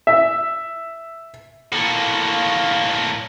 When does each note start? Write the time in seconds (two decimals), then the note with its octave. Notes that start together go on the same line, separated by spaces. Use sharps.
0.07 E5
1.72 A2 A#3